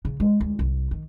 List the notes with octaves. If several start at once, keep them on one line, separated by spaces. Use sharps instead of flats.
C#3
G#3
D2
C2
D#3